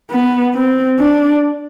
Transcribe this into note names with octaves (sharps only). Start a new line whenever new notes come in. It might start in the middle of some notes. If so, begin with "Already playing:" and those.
B3
C4
D4